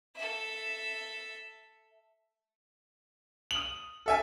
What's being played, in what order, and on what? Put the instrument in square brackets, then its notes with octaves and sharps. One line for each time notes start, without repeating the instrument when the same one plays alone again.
[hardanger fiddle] A4 E5
[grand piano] D#6 F#7
A4 E5 G#5